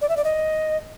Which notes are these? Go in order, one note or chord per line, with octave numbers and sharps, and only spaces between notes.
D5
E5
D5
D#5